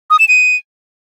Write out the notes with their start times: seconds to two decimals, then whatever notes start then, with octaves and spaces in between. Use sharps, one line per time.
0.10 D#6
0.19 E7
0.28 D#7